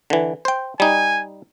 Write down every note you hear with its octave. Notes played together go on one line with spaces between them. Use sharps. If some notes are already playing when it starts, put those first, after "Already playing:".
D3 E3
C5 G5
G3 D#4 G#5